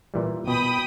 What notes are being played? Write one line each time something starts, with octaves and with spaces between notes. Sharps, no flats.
A#2 E3 G3
B2 G5 B5 D#6